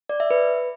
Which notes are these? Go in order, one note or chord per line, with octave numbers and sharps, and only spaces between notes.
D5
E5
B4